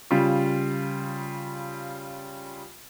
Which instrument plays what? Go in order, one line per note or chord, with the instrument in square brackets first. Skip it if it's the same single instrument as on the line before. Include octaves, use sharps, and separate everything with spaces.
[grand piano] C#3 G3 F4